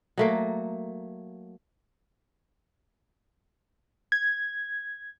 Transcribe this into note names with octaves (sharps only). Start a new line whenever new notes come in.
F#3 A3 A#3
G#6